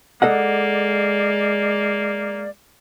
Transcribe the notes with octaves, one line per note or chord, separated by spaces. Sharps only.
G#3 A#3 A4 D5 D#5 F#5